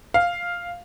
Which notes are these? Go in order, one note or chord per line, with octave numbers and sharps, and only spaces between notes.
F5